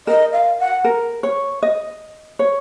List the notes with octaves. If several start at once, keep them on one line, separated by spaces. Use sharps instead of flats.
A#4 D#5
F5
F#5
A#4
C#5
D#5
C#5